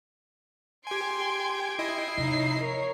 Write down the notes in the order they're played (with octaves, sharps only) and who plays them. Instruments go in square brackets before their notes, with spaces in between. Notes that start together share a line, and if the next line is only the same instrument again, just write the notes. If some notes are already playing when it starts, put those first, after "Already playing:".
[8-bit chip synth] G4 G#5 [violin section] G5 G#6 D7 [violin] C6
[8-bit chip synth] E4 D#5 [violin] C7
[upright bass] C3 F3 [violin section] D#4 C#5
[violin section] A#4 C#5